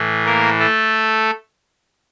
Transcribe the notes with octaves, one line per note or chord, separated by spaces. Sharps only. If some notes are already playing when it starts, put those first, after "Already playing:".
Already playing: A2 E3
A#3 A#4
A3 A4